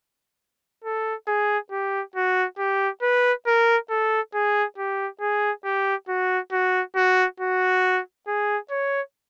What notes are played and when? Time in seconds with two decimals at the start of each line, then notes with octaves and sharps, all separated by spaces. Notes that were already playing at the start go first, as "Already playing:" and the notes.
0.84 A4
1.28 G#4
1.72 G4
2.16 F#4
2.58 G4
3.02 B4
3.47 A#4
3.90 A4
4.34 G#4
4.78 G4
5.21 G#4
5.65 G4
6.09 F#4
6.52 F#4
6.96 F#4
7.40 F#4
8.28 G#4
8.71 C#5